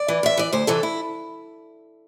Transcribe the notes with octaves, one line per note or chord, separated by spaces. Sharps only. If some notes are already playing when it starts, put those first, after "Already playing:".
Already playing: D5
E3
E2 E5
E3 D5
D2 C5
C3 E3 A4
E4